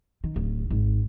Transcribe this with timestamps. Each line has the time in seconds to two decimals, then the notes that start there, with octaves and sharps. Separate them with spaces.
0.24 D#3
0.36 D1
0.70 G#1